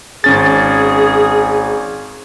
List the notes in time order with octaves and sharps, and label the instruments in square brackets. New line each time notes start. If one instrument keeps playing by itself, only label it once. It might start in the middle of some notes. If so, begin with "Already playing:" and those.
[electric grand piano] G#1 C#4 A6 [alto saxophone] G#4